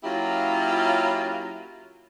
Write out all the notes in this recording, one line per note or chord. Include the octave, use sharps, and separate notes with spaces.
F#3 A#3 C#4 E4 F4 G4